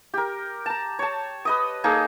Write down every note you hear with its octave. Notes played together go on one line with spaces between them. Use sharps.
G4 A#4
A5 A#5
C#5 A5
B4 D#5 D#6
A#3 D#4 G#4 A4